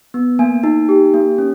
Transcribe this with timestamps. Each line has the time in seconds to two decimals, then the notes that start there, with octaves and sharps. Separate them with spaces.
0.14 B3
0.39 A#3 G#5
0.64 D#4
0.89 G4
1.14 A#3
1.38 C#4